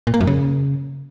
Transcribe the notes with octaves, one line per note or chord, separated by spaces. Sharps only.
A#2
A#3
F#2
C#3